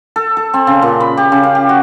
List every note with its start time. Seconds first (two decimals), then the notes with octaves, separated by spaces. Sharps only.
0.16 A4
0.37 A4
0.54 C4
0.67 C#3
0.82 A#2
1.00 B5
1.17 G4
1.32 C#3
1.43 F5
1.55 G4
1.69 F#4